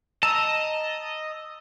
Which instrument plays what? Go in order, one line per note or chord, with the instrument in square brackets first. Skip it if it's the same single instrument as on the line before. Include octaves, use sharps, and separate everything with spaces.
[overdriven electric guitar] D#5 [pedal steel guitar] A5 A#5 [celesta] E6